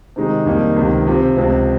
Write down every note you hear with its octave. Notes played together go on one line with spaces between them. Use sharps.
C3 D#3 G#3 D#4
F2 D#3 G3 A#3 D#4
C#2 C3 D#3
C3 F3 C4
C#2 C3 F3 C4